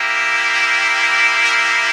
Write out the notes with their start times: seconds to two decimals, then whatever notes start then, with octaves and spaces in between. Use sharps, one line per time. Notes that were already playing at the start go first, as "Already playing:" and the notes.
Already playing: A#3 E4 G4
1.45 A#4